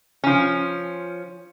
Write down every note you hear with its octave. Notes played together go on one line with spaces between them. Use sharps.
F3 C#4